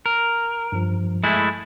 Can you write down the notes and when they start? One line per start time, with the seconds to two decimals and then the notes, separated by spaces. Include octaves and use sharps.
0.06 A#4
0.72 G2 F3
1.24 G#3 A3 E4 G#5